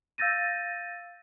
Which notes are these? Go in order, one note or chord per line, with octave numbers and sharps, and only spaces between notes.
F5 E6 G6 A6 A#6 D#7